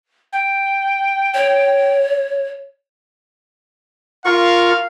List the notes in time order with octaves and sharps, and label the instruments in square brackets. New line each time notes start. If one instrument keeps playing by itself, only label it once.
[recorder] G5
[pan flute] C#5
[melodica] F4 A#4 C#6 [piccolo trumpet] F5